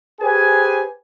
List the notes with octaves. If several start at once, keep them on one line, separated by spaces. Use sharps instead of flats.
G4 G#4 B4 C5 G#5